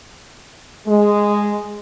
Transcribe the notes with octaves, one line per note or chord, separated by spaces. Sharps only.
G#3